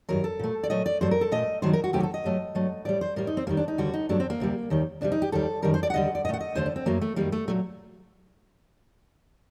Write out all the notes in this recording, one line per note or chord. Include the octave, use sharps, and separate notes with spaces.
G2 D#3 F#3 A#4
A4
A#2 A3
D5
A#2 F#3 A3 D#5
D5
G2 F#3 A3 C5
A#4
A4
A#2 A3 D#5
G2 D#3 F#3 A3 C5
A#4
F#4
D2 C3 D#3 F#3 A3 G4
A4
D#5
G2 F#3 A3
G2 F#3 A3
A2 G3 D5
C5
A2 G3 A#4
D#4
C4
D#2 D#3 G3 A#3
D4
D#4
D#2 D3 G3 F#4
D#4
G2 F#3 A3 D4
C4
A#3
D2 C3 G3
D#2 D#3 G3
D2 C3 G3 D4
D#4
G4
D#2 D#3 G3 A4
F#2 D#3 G3 A#4
C5
D5
F#5
D#2 D3 G3 D#5
D5
A#2 A3 D#5 F#5
D#5
D#2 D3 A3 C5
D4
C4
F#2 F#3 A3 A#3
A3
F#2 D#3 G3 A#3
A3
A#2 F#3 A3